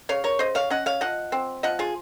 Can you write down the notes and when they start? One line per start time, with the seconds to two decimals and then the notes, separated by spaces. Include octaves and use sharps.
0.09 C#3 C#5 F5
0.24 A#4 C#5
0.39 C#3 C5 D#5
0.55 C#5 F5
0.70 C#4 D#5 F#5
0.86 C#5 F5
1.01 F3 D#5 F#5
1.32 C4
1.63 F3 D#5 F#5
1.79 F4 G#4